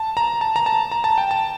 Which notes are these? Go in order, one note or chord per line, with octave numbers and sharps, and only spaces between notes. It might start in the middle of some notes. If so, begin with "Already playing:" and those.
Already playing: A5
A#5
A5
A#5
A5
A#5
A5
G5
A5